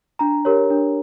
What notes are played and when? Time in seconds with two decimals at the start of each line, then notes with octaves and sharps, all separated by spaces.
0.19 D4 A#5
0.45 G4 A#4 C#5
0.70 D4